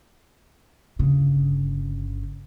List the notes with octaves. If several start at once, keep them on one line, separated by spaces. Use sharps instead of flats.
G1 C#3